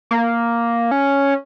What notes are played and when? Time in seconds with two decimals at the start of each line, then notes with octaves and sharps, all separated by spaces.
0.11 A#3
0.91 C#4